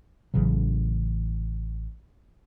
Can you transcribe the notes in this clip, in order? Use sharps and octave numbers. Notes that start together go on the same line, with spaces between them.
A1 C#3 E3 F#3